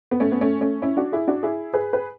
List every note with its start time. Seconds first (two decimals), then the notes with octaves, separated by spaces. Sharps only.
0.11 B3
0.20 A3 C#4
0.32 B3
0.41 A3 C#4
0.61 A3 C#4
0.82 C#4 E4
0.97 D4 F#4
1.12 E4 G#4
1.28 D4 F#4
1.43 E4 G#4
1.73 G#4 B4
1.93 B4